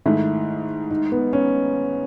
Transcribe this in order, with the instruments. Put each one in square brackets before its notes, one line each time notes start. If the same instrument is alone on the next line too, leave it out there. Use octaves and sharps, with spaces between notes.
[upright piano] G#2 D#3 A3 [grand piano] E4
[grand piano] D#4
B3
C#4